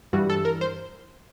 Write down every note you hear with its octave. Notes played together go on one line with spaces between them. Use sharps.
G2 E3 G3 F#4
A4
A#4
C5